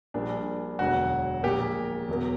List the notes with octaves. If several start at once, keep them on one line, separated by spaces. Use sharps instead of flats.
A#1 A#2 G3 A#3 D4
E1 D2 D3 F#3 F#4
A#1 A#2 A#3 G4
E2 B2 F#3 A#3